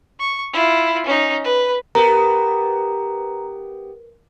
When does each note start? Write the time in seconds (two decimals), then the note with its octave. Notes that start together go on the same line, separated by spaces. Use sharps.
0.20 C#6
0.53 E4 F4
1.06 C#4 D#4
1.44 B4
1.95 B3 G4 A#4 B4 A#5